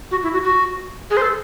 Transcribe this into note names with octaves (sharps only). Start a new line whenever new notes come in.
F#4
E4
F#4
F#4
G#4
C5
A4